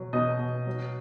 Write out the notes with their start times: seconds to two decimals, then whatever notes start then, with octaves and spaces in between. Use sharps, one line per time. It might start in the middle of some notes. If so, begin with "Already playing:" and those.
Already playing: B2 F#3
0.13 B2 D#4 D#5
0.40 B2
0.67 F#3